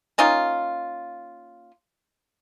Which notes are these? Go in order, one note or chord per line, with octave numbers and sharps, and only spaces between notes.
A#3 C#4 D#4 F4